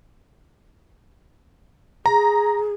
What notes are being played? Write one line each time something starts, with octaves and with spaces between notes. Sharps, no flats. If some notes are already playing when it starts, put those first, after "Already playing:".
G#4 A#5